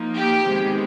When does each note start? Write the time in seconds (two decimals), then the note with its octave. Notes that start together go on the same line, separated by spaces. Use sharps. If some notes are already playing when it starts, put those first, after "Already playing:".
Already playing: F3 A#3 D#4
0.15 G4
0.45 C3 D#3 G#3 B3